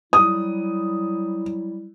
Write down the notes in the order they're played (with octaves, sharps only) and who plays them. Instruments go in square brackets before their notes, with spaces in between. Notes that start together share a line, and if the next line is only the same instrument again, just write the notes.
[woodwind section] F#3 G3 E4 [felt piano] D#6